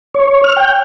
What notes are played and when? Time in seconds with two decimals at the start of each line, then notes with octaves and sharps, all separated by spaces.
0.14 C#5
0.44 F6
0.57 G5